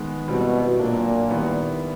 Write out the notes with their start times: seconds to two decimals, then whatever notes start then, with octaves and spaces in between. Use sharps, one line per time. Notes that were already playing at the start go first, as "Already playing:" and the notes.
Already playing: D#3 G#3 B3
0.28 B2 G3 C4 E4
0.79 A#2 F#3 A#3 D4
1.30 D#3 G3 B3 E4